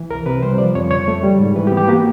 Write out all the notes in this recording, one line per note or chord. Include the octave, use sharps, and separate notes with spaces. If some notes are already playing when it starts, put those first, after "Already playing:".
Already playing: E3
C2 A#4
C3 B4
G3 C5
F3 D5
F2 C#5
C#3 C#5
A3
G3
G#2
E3 B4
G4
B3
G4
A#3 F#4